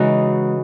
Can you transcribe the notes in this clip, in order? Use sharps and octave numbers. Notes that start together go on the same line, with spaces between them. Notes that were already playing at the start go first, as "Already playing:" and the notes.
Already playing: C#3 E3 G#3 D#4 F#4